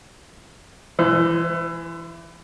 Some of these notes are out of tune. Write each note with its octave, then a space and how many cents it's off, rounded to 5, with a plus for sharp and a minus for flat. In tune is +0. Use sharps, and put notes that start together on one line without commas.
E3 +20 C5 -25